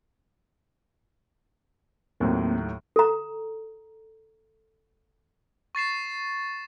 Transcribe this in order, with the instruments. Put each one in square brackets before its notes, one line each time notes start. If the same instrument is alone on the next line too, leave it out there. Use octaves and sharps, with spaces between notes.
[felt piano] D#2 A2 F#3 [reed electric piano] A#3 C4
[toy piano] A4 A#5
[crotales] C#6 A6 C7 E7